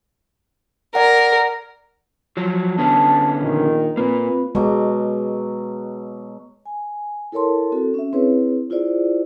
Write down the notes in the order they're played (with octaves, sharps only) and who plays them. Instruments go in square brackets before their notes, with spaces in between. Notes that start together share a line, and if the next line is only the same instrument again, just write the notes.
[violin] A#4 [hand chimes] D5 F#5
[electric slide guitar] F3 F#3
[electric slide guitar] D3 B3 C#4 [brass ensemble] A5
[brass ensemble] A#1 A#2 D#3
[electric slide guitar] A#2 A#3 [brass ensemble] C4 F4 B4
[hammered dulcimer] B2 F#3 D6 [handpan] G#3
[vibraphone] G#5
E4 A4 A#4 C#5 A5 C6
C4 F#4 A4
C#4 E5
C4 E4 G#4 B4 C#5
E4 F4 G#4 C5 D5